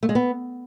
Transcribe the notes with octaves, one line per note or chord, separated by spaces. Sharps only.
A3
G#3
B3